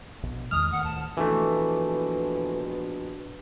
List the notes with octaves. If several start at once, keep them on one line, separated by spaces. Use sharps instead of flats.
A#1 B2
E2 D#3 G#3 D#6 F6
D1 D#3 A3 F#5
A5
A#1 B2 E3 A3